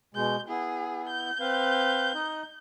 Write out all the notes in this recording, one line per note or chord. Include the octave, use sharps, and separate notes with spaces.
B2 G#3 G6
B3 E4 G#4
G6
C4 B4 F5
D#4 D#5